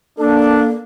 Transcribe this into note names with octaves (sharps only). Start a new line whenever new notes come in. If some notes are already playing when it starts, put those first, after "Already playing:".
A#3 D4 A4